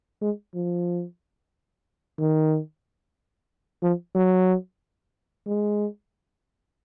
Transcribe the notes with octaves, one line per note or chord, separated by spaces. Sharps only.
G#3
F3
D#3
F3
F#3
G#3